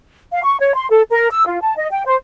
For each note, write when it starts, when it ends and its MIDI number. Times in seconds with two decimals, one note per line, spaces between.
0.32 0.41 77
0.43 0.57 85
0.61 0.75 73
0.75 0.87 84
0.90 1.02 69
1.09 1.28 70
1.31 1.45 88
1.45 1.60 65
1.61 1.74 81
1.77 1.88 75
1.90 2.03 79
2.06 2.16 72